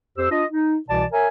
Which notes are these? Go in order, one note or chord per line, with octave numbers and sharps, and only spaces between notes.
F2 G4 C5 E6
D4 F4 D#5
D#4
C2 B2 E3 D5 A5
A#4 C#5 E5 G#5